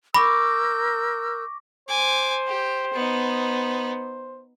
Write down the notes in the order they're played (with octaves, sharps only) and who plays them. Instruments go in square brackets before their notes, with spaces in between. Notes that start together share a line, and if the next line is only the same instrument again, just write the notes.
[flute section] A#4 E6 G6 [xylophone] B5 [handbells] C#6 D6 A#6
[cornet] C5 [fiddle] G#5 D6
[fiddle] G4
B3 D#4